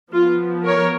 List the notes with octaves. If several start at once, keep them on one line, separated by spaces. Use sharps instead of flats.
F3 B3 F4
A#4 C#5